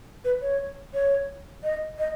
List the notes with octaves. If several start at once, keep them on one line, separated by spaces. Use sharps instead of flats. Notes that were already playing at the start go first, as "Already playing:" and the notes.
B4
C#5
C#5
D#5
D#5